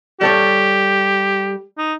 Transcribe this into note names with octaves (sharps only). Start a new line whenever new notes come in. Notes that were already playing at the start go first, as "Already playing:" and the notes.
G3 G4 A4 C#5
D#4